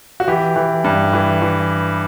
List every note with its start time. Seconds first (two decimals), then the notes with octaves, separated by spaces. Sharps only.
0.20 F#4
0.28 E3 G4
0.56 E3
0.84 G2
1.13 E3
1.42 E3